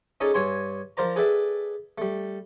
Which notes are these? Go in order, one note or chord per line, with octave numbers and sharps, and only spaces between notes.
C#4 D#4 G#4 A4 D5
G2 C#5 G#5 C6
F3 A#4 C5 D5 A#5
G#4 A4 B4 D5 E5 G5
G3 A3